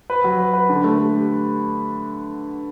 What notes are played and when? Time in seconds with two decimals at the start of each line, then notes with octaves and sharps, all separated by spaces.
0.10 B4
0.24 F#3
0.39 B4
0.53 B4
0.69 D3
0.84 A3
0.99 A3
1.14 G4